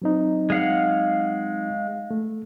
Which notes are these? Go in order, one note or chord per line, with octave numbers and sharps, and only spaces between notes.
F#3 C4 D#4
G#3 F5 F#5
A3